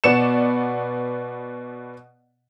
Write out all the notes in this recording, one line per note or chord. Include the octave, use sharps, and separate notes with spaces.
B2 B3 D5 C#7 E7